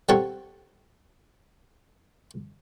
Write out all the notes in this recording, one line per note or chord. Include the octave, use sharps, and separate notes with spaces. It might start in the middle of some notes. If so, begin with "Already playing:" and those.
G3 C4 A4 C#5 F#5